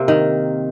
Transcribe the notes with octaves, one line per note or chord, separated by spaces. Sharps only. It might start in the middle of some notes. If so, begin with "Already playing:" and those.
Already playing: C3 A#3
D#3